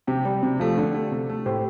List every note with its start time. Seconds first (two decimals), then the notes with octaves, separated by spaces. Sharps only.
0.07 C3 G4
0.25 G3
0.43 C3
0.60 F3 A3
0.78 D3
0.95 A3
1.11 C3
1.30 A3
1.46 A2 G4 C5